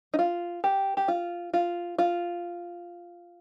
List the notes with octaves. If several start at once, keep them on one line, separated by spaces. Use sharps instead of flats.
D#4
F4
G4
G4
F4
F4
F4